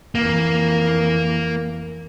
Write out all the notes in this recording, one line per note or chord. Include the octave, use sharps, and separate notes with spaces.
F2 E3 A#3